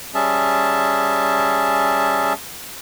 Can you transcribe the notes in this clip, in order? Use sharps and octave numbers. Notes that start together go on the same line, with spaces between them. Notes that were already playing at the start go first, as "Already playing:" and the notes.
G3 C#4 G#4 E5 A5